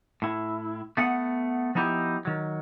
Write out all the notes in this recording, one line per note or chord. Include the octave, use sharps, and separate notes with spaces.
A2 E4
A3 B3 F#5
F3 B3 D#4 E4 G4
D#3 F#3